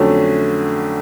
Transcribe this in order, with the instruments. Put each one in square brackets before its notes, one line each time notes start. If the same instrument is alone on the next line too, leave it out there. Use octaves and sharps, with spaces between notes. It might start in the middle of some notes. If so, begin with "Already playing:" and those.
Already playing: [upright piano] F2 D3 F#3 A3 C#4